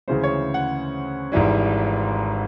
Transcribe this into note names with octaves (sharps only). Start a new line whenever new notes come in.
D2 C#3 E3 G#3 C5
C#5
F#5
G#1 G#2 E3 G3